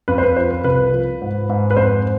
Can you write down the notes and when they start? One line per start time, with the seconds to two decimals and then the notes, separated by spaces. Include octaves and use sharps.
0.08 F2 B4
0.18 C5
0.23 B4
0.37 F3 C5
0.51 B4
0.64 C2 B4
0.93 F3
1.21 G#2
1.49 G#2
1.71 B4
1.77 F2 C5